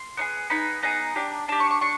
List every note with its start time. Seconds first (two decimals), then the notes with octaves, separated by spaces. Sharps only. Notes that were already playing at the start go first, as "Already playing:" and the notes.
Already playing: C6
0.17 B3 D#4 G#4
0.50 B3 D#4 G#4 B5
0.83 B3 D#4 G#4 A#5
1.16 D4 G4
1.48 D4 G4 A5
1.60 C#6
1.70 C#6
1.81 D4 C#6